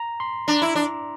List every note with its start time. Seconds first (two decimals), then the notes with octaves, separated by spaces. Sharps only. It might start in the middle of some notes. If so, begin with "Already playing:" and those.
Already playing: A#5
0.20 C6
0.48 D4 A#5
0.62 E4
0.75 D4